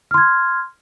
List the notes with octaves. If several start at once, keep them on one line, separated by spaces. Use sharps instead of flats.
C6 F6 G#6